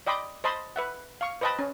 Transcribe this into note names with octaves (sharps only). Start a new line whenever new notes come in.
D5 D#5 G5 B5 C6 D6
C5 D#5 A5 B5 C6
B4 E5 F#5
F5 C#6
B4 C5 D#5 G5 A5 B5
C#4